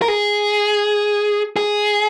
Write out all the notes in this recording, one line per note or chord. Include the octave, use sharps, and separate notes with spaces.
A#4
G#4
G#4